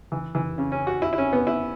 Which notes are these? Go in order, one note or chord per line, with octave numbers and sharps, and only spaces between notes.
E3
E3
C#3
C#4
F#4
E4
E4
C#4
B3
E4